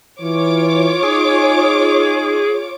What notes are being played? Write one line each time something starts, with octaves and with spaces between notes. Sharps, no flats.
E3 F4 C#5 D6
D#4 G#4